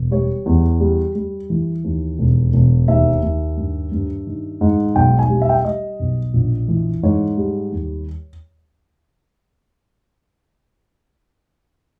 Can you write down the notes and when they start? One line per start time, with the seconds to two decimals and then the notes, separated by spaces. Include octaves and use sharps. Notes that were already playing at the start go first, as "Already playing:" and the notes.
Already playing: E1
0.11 G3 C#5
0.46 E2
0.80 G3
1.15 G3
1.50 E3
1.84 D#2
2.19 E1
2.54 E1
2.88 D#2 E5
3.23 D#2
3.57 G2
3.92 G2
4.27 D#3
4.61 G#2
4.96 B1 G5
5.19 G#5
5.30 G3
5.42 E5
5.49 G5
5.57 E5
5.65 G3 D#5
6.00 B1
6.34 A#1
6.68 E3
7.03 G#2 C#5
7.37 G3
7.72 D#2